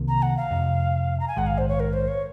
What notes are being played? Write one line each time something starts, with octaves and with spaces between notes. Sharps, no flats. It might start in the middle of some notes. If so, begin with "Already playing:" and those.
Already playing: C2 C3 D#3 A#3
A#5
F#5
F5
F2 C3 F3
A#5
G#5
A#1 G#2 D#3 G#3 F#5
F5
C5
C#5
A#4
C5
C#5